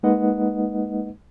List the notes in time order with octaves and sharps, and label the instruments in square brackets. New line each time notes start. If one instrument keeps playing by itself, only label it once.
[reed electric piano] G#3 A#3 D#4 B4 D#5 F#5